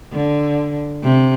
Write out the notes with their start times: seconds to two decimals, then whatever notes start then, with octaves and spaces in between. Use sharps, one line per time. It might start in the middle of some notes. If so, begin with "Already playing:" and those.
0.12 D3
1.03 C3